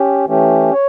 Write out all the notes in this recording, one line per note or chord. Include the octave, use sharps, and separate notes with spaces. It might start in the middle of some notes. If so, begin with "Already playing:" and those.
Already playing: C#4 G4
E3 A3 C#4 G4
C#5